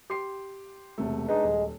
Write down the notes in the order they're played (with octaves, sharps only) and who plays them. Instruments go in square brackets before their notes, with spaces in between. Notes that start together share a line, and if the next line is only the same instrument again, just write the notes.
[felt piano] G4 C6 C7
E1 C3 A3
[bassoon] G#3 [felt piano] D4 D#4 B4
[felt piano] D#1